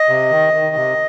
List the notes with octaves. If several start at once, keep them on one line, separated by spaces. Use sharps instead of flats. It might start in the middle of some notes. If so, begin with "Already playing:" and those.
Already playing: D#5
C3
D#3
D#3
C3